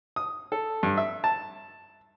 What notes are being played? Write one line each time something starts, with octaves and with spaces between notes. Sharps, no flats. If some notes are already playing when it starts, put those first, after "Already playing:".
D#6
A4
G2
E5
A5